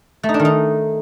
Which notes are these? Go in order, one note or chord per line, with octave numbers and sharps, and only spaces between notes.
A3
D#4
D4
D#3
D#4